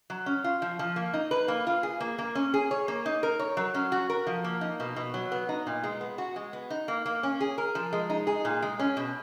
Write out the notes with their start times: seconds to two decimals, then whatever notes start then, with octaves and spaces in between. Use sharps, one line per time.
0.10 F#3
0.26 C#4
0.44 F4
0.62 F3
0.79 F3
0.96 A#3
1.14 D#4
1.31 B4
1.48 A#3
1.67 F4
1.83 G#4
2.00 A#3
2.19 A#3
2.35 C#4
2.54 G#4
2.71 C#5
2.88 A#3
3.06 D#4
3.23 A#4
3.39 C#5
3.57 F#3
3.74 C#4
3.92 F#4
4.10 A#4
4.27 F3
4.44 A#3
4.61 D#4
4.80 B2
4.96 B2
5.14 F#3
5.32 B3
5.49 D#4
5.67 A#2
5.84 G#3
6.01 B3
6.18 F#4
6.36 G#3
6.53 B3
6.70 D#4
6.88 A#3
7.06 A#3
7.23 C#4
7.41 G#4
7.58 A#4
7.75 F3
7.93 G#3
8.10 D#4
8.27 G#4
8.45 A#2
8.62 G#3
8.79 C#4
8.97 B2